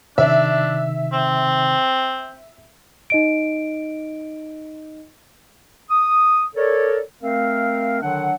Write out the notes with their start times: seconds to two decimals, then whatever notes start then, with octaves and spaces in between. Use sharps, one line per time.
0.18 C3 D#3 D4 D#4 E5
1.13 C4
3.10 D#4 D#5 D7
5.89 D#6
6.55 A4 A#4 C#5 D5
7.22 A3 C4 A#4 F5
8.02 D3 D#3 F#3 D4 F#5